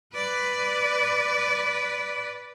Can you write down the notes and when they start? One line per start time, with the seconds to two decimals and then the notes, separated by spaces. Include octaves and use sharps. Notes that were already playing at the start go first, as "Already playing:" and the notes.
0.14 B4 D5